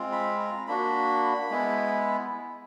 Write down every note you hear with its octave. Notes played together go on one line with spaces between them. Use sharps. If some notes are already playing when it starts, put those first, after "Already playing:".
Already playing: G#3 C4 F4
B5
A#5
A#3 D4 F#4 B5
G#3 B3 E4